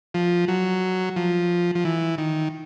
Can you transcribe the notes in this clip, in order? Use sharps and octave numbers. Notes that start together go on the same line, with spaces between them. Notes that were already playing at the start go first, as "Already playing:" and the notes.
F3
F#3
F3
F3
E3
D#3